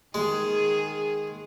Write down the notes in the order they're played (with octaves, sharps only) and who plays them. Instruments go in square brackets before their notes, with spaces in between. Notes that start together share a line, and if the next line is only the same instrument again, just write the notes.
[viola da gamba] D#3 G#4 [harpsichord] G#3